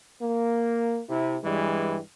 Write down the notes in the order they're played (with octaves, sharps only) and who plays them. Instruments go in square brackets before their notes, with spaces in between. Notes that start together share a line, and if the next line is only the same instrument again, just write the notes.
[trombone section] A#3
C3 E4
G2 E3 G3 G#3